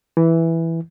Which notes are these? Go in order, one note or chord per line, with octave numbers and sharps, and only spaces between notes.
E3